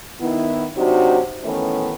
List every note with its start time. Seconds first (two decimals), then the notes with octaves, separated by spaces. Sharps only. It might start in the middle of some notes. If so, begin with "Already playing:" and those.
0.20 D#3 B3 E4
0.77 C3 F#3 D4 D#4 F#4
1.44 D#3 E3 A3 B3 C#4 D#4